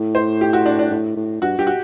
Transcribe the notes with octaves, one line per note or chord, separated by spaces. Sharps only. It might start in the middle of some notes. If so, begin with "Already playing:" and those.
Already playing: A2
C5
G4
F#4
D4
D4
A2
A2
G2 F#4
G2 G4
F#4